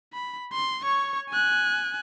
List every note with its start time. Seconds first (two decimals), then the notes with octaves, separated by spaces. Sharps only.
0.13 B5
0.53 C6
0.84 C#5 C#6
1.29 G#5 F#6